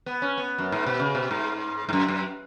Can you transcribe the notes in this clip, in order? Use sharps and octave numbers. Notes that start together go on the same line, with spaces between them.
B3
C#4
B3
F#2
G#2
B2
C#3
B2
G#2
G#2
F#2
F#2